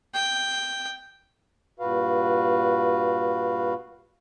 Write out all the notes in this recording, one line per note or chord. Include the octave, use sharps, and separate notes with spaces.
G5
G2 A#2 F#4 B4 F5